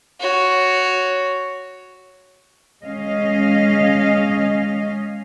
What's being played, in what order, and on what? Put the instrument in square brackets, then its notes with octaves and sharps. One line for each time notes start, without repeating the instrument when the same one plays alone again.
[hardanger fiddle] F#4 C#5
[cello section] G#3 C#4 D#5 F5